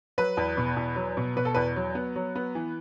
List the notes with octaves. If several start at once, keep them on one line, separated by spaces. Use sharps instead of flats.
F#3 B4
E2
B2
E2
F#3
B2
B2 B4
A4
E2 B4
F#3
B3
F#3
B3
E3